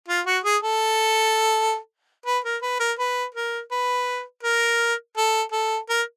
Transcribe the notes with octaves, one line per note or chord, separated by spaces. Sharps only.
F4
F#4
G#4
A4
B4
A#4
B4
A#4
B4
A#4
B4
A#4
A4
A4
A#4